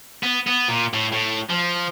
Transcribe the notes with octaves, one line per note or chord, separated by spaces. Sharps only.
B3
B3
A#2
A2
A2
F3